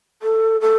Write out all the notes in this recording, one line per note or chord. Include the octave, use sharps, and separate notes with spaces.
A4
A4